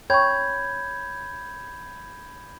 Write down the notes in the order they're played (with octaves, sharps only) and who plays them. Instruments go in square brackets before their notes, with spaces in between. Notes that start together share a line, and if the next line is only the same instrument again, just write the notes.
[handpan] C#5 [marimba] G5 C#6 [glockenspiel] B5 G6 G#6